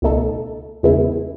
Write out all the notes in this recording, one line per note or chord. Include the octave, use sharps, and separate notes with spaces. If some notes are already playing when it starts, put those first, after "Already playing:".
C#2 B2 A3 D#4 A4
E2 C#3 G#3 B3 E4